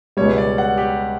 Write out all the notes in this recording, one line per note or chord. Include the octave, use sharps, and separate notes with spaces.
C#2 B2 G3 C#5
D5
F#5
G4